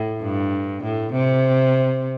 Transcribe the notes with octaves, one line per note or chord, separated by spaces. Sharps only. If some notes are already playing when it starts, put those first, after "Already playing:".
Already playing: A2
G2
A2
C3